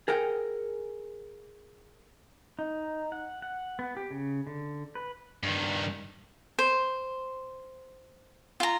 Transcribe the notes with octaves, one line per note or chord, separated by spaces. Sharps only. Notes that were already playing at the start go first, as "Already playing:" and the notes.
G#4 A#4 F#5 G5
D#4
F#5
F#5
B3
G4
C#3
D3
B4
G2 D#3
C5
F4 A#5